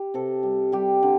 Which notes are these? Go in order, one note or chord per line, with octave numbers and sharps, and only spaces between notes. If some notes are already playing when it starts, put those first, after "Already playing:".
Already playing: G4
C3 A4
G3
G3 G4
D3